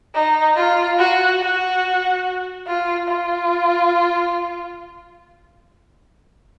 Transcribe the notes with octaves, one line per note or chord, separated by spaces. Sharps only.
D#4
F4
F#4
F#4
F4
F4